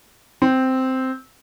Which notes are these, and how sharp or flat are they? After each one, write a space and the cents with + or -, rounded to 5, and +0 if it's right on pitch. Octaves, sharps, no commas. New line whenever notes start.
C4 -5